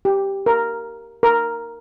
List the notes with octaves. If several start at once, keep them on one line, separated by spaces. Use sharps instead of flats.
G4
A#4
A#4